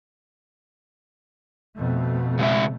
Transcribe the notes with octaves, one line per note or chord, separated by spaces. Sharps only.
F2 B2 A3
C#3 G#3 E5